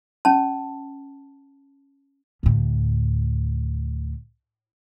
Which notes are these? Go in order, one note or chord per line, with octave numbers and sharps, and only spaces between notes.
C#4 A5
D2 A2